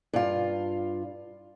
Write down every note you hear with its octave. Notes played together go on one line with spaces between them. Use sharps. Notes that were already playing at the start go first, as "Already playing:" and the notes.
G2 F4